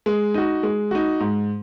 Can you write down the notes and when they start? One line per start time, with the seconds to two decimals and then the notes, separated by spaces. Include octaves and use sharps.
0.06 G#3
0.34 D#4 F#4
0.63 G#3
0.91 D#4 F#4
1.20 G#2